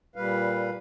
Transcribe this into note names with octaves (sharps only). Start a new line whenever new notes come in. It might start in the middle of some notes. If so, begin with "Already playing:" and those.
A#2 G3 B4 F5